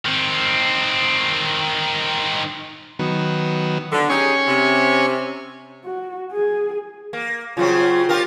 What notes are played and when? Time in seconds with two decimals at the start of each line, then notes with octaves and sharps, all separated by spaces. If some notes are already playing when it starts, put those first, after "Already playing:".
0.06 D#3 C4
2.99 D#3 F#3 B3
3.92 D3
4.09 C#4 D#4 G4 G#4 G#5 C#6
4.48 C3
5.85 F#4
6.32 G#4
7.13 A#3
7.57 C#3 F#3 C4 F4
8.09 F4 G4 A#4